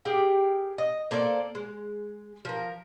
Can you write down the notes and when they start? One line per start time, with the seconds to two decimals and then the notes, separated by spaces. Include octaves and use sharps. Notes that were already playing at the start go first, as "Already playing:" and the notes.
0.05 G4 G#4 A#4 G5
0.78 D#5
1.11 A#3 A4 C5 D5
1.55 G#3
2.45 F3 A#4